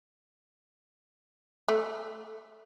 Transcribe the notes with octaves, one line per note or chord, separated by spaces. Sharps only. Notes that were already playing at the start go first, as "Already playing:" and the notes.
A3